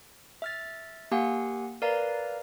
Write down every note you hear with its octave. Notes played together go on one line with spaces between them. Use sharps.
E5 F6 A6
A#3 G4 F5 F#5 G#5
A#4 B4 D5 F5 A#5